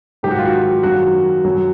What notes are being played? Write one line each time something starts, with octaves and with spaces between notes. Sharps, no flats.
G#2 D#3 F#3 G4
F#4
F4
F#4
F#2 D#3 F#3 F#4
F#2 D#3 F#3